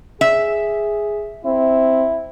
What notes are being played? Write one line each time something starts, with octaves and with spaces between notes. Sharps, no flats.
G#4 E5
C4 E4